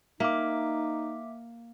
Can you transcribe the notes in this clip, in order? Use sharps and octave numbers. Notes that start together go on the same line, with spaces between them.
A#3 D#4 E5 D6